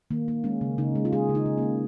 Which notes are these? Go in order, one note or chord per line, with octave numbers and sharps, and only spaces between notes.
D#3 A#3
A#3
G#3 C#4
C#3
C#3 D#4
G#3
F4
G#3 G#4
C#3
D#4
C#3
A#3
G#3